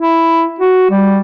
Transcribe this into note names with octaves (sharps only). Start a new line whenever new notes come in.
E4
F#4
G3